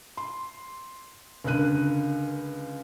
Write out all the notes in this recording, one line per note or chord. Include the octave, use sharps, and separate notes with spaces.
C6
C#2 D3 A#4 F#6 D#7